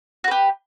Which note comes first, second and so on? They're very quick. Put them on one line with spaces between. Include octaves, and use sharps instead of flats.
F#4 B4 G4